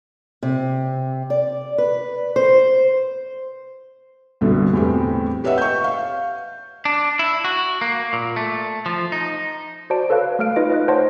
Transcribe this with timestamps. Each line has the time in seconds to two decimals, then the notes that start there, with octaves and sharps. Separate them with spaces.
0.43 C3
1.30 D5
1.78 B4
2.36 C5
4.41 C2 G2 B2 D3
4.73 E2 A2 C4 G4
5.44 G4 B4 C#5 D#5 E5 F#5
5.58 C#6 G6
5.84 F5
6.85 D4
7.19 E4
7.44 F#4
7.81 A#3
8.13 A#2
8.36 A3
8.86 F3
9.12 D#4
9.90 F#4 C5 D5 A5 D7
10.10 A4 B4 C#5 F5 F#6
10.39 A3 F5 F6 D7
10.56 D#4 F4 B4 D#5
10.70 B4 D#5 F#6
10.88 C5 C#5 D#5 F#5 A5 C6